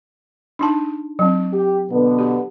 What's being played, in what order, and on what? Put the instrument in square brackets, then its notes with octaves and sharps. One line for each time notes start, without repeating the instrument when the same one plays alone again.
[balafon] D4 D#4 A5
F#3 C4
[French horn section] G4
B2 D3 B3
[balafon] G4